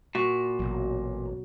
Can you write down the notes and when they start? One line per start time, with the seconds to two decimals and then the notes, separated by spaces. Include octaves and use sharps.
0.15 A#2 F#4
0.59 A1 B2 F#3